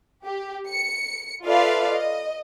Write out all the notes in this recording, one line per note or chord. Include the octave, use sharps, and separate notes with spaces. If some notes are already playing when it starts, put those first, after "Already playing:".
G4
C#7
F4 A4 B4 D5 E5 F5
D#5